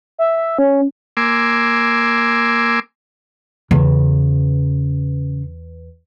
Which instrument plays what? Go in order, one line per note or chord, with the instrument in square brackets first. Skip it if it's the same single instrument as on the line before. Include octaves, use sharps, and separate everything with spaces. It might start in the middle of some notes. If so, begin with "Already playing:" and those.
[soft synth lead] E5
E5
C#4
[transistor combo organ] A#3 G#5 C6 D6 E6
[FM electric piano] E2 [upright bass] C#3